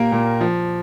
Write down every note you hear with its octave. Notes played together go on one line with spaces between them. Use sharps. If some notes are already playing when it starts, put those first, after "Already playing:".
Already playing: A#2 A#3 G4 A#4
A#2
F3